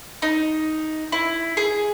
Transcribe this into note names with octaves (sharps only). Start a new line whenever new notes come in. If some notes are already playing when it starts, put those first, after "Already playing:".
D#4
E4
G#4